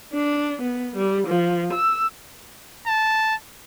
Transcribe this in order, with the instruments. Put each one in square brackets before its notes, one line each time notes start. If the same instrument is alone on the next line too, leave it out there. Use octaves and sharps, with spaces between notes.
[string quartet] D4
B3
G3
F3
E6
[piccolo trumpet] A5